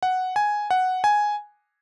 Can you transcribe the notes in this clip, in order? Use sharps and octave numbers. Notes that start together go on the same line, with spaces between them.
F#5
G#5
F#5
G#5